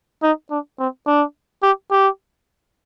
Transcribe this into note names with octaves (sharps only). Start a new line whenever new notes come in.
D#4
D4
C4
D4
G4
G4